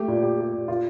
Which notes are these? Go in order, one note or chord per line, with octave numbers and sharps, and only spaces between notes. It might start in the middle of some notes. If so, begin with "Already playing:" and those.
Already playing: A3 G4
A#2
G4
G4
A#2
F4